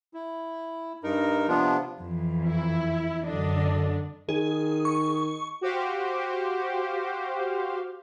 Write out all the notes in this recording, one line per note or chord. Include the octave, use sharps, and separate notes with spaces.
E4
G2 D#4 A#4
C3 F3 B3 D4 F4
F2 E3
E4
F#2 D3 D4 D#5
D#3 G#4
C#6
F#4 G4 C5 F5